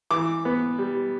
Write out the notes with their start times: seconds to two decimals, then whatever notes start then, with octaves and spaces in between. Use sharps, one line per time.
0.11 E3 D6
0.45 B3
0.79 G3